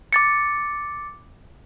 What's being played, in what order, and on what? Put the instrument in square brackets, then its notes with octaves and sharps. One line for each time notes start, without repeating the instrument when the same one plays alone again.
[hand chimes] D6 A6 C#7